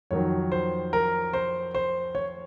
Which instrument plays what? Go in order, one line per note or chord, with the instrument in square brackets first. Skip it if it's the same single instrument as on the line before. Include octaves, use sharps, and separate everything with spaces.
[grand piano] F2 D#3 F#3 C#5
C5
A#4
C5
C5
C#5